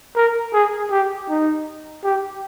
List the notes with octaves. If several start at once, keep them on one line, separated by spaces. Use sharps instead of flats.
A#4
G#4
G4
D#4
G4